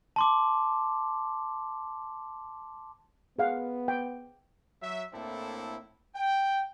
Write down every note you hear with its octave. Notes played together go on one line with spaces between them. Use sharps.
A5 C6 D6
B3 G#4 F5 F#5
G5
F#3 E5
A2 A#3 C4 D4 E4 A4
G5